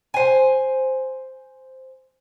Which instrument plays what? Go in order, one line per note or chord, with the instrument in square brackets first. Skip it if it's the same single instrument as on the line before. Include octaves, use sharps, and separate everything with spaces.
[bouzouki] C5 G#5